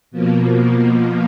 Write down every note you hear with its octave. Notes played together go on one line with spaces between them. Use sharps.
B2 F3 A#3